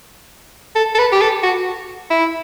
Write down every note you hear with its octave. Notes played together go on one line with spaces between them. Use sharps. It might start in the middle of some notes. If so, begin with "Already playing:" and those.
A4
A4
B4
G4
A4
F#4
E4